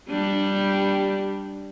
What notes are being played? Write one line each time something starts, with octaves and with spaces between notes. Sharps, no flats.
G3 D4 G4